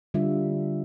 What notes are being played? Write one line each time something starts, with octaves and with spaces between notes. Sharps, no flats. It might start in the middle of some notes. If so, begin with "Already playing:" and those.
D3 G3 D4 F4 E5